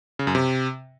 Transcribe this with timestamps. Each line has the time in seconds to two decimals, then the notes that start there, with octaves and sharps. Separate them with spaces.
0.19 C#3
0.27 F#2
0.35 C3